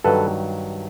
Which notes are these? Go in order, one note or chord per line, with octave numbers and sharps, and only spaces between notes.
G2 D#3 F#3 A4 B4